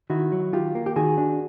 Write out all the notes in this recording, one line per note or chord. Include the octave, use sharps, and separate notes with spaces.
D#3 E4 F#4
F#3
D#3 F4 G4
A#3
G4
D#3 F#4 G#4
D4